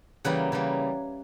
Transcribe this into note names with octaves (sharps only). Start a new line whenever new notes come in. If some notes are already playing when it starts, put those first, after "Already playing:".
C#3 E3 G3 A#3 F#5
C#3 E3 G3 A#3